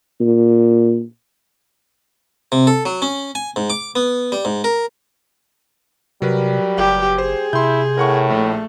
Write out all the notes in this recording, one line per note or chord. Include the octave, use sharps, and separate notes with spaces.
A#2
C3
A4
F#3
C#4
G#5
G#2
D6
B3
G3
G#2
A#4
C3 F#3 G3 A#4 B4
F#1 G4
G#4 C5
C3 E4 C6 G6
A2 A#4 F#5 C#6
A#1 A3